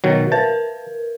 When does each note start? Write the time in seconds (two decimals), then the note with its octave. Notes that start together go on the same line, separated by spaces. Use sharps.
0.04 B2 D#3 F#3
0.32 A#4 B4 A5